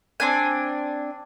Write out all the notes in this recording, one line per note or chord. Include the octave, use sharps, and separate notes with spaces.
C4 D4 G#5